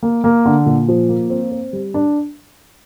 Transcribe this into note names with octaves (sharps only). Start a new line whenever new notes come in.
A#3
A#3
D3
A#2
F3
A#3
C4
C4
G3
D4